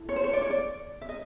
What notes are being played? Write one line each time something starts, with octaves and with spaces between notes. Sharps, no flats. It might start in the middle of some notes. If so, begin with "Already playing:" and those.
Already playing: E4 A4
C#5
C5
C#5
D5
C#5
D5
E5
D#5